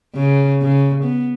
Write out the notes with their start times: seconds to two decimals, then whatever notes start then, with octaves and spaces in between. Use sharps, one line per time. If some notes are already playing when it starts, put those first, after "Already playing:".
0.15 C#3
0.62 C#3
1.04 B3